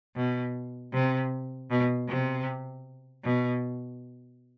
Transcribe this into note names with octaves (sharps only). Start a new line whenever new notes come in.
B2
C3
B2
C3
B2